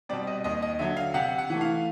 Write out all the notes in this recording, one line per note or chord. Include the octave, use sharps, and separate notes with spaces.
B2 G3 C4 D5
D#5
D#2 D#5
D#5
D3 F#3 E5
F5
C3 F#5
F#5
E3 A3
F5